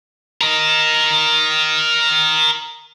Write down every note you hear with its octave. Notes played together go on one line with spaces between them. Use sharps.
A#4 D#5